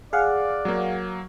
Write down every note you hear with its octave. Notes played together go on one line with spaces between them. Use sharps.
G#4 D5 F5 F#5
F#3 A#3